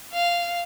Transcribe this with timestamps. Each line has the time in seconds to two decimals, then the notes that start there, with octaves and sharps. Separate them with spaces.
0.13 F5